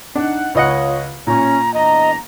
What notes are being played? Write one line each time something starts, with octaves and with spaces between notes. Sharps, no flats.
D4 D#4 F#5
C#2 F4 C#5 D#5 F#5
A#2 C#4 A#5
E2 D4 D#5 A#5